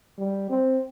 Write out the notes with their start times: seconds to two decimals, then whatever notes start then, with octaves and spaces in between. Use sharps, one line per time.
0.18 G3
0.50 C4